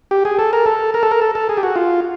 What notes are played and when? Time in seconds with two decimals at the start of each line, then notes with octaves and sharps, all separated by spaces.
0.11 G4
0.25 G#4
0.39 A4
0.53 A#4
0.66 A4
0.94 A#4
1.03 A4
1.11 A#4
1.22 A4
1.35 A4
1.49 G#4
1.57 G4
1.63 F#4
1.76 F4